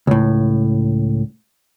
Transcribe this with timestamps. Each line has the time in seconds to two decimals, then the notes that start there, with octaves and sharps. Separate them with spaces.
0.07 C#2 A2